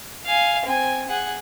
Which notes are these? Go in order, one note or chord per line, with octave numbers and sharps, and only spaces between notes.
F5 G#5
C4 G#5
G#4 F#5